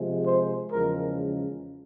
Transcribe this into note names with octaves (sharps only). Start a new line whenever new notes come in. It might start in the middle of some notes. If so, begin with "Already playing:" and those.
Already playing: C3 F3 G#3
C5
E2 C#3 F3 G#3 A#4